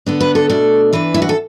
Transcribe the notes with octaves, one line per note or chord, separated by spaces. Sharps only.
D3 B3 D4
B4
A4
B2 A3 D4 A4
E3 D4 B4
E4
F#4
A4